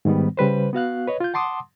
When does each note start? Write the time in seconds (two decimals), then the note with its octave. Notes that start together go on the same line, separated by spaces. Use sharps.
0.05 G#2 D#3 G3 B3
0.37 C#3 G3 B4 C5
0.73 B3 F#4 F5 F#6
1.08 B4 C#5 D#5
1.20 F4 G6
1.34 F#5 A5 C6 D6 D#6